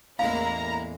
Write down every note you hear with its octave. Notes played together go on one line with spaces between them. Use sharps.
A1 E2 G#3 A#3 E4 F5 A#5